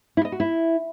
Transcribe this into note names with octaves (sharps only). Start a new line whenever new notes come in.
E4
D#5
F#4
E4